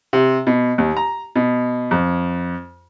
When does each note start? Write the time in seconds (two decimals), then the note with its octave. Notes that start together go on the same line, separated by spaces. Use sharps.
0.13 C3
0.47 B2
0.78 D#2
0.97 A#5
1.36 B2
1.91 F2